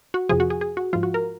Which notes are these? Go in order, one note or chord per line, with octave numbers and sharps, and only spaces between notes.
F#4
F2 C3 F3 G#4
F#4
G#4
G#4
F#4
G#2 F3 F4
F#4
A#4